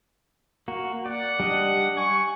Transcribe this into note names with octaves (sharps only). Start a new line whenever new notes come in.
A#3 F#4
D5 F#5
G3 D4 D#5
G#5 C#6